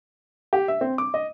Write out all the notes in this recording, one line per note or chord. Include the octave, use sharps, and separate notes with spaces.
G4
E5
C4
D6
D#5